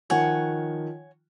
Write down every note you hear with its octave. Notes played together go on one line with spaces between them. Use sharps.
D#3 F3 C#5 F#5 G#5